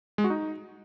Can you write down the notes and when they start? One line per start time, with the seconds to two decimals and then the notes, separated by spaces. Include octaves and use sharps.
0.18 G#3
0.24 F#4
0.30 D#4